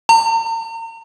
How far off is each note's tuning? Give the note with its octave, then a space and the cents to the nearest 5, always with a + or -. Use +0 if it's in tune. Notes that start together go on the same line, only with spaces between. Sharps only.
A#5 -40